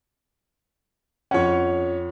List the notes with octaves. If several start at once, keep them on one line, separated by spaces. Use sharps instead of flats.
F2 C#4 C#5 F#5